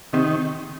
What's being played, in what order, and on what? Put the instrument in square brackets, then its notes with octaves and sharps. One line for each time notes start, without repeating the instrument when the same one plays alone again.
[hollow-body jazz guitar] C3 [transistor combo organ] D#3